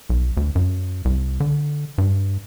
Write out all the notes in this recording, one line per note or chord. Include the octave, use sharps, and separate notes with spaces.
B1
D2
F#2
C2
D3
G2